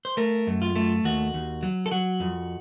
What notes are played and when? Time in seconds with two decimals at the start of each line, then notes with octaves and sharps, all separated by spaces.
0.05 C5
0.17 A3 A#4
0.47 F#2
0.62 F4
0.76 A3
1.04 D#2 F#4
1.34 D#2
1.63 F#3
1.86 A4
1.91 F#3 F#4
2.20 F2